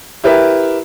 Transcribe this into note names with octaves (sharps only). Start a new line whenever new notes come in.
E4 G4 A#4 B4 E5